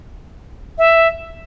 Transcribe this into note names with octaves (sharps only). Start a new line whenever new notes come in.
E5